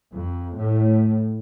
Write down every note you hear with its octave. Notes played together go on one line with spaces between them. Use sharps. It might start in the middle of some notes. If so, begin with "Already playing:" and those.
F2
A2